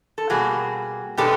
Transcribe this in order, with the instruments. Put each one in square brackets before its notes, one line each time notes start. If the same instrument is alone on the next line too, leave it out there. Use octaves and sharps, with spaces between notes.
[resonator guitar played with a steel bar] A4
B2 G3 A#3 F#4 G#4
B2 G#3 B3 D4 G4 A4